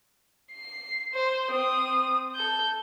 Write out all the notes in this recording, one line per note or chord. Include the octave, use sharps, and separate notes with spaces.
C7
C5
C4 D#6
A4 G6